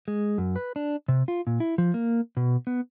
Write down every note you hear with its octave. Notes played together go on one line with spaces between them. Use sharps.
G#3
F#2
B4
D4
C3
F4
A#2
E4
F3
A#3
B2
B3